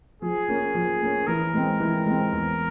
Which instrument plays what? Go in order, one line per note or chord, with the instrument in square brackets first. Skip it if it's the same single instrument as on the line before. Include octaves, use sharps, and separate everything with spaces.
[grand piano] F3 [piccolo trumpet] G#4
[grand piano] A#3 C#4
F3
A#3 C#4
[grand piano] E3 [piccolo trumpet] A#4
[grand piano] G#3 C4
E3
G#3 C4
E2